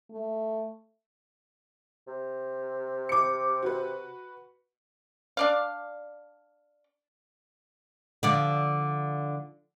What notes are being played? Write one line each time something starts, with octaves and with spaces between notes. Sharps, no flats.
A3
C3
D6 C#7
F#4 B4
D4 D5 F5
D3 F3 D5